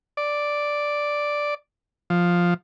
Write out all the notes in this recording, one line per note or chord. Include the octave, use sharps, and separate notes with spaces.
D5
F3